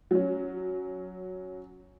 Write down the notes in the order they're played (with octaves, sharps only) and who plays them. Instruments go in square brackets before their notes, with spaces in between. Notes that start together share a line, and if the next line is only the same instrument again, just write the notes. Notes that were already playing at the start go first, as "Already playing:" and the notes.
[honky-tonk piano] F#3 C#4